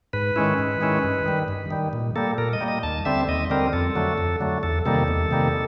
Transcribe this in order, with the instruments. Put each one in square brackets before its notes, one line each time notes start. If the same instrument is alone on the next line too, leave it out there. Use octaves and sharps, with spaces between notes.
[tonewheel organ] G#2 B4
D#3 G#3 C#4 E4
G#2
D#3 G#3 C#4 E4
G2
D#3 G3
G2
D#3 G3
A#2
G3 A#3 A4
A#2 A#4
D#5
G3 A#3
D#5
D#2 A5
D3 G3 C4 E5
D#2 D#5
D3 G3 C4 A#4
F2 A4
D3 F#3 A3
F2
D3 F#3 A3
E2 A4
C3 D#3 G3 A#3 A4
E2
C3 D#3 G3 A#3